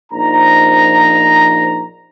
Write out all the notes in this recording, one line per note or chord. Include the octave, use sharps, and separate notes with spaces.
A#1 F3 D#4 A#5